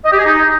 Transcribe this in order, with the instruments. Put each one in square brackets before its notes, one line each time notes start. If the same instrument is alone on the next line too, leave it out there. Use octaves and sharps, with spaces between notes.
[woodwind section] D#5
G4
G#4
D#4